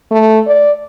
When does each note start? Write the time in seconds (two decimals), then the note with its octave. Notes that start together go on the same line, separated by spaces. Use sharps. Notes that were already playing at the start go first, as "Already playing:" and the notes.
0.12 A3
0.47 D5